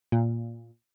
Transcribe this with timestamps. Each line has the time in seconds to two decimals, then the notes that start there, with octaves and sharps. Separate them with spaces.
0.12 A#2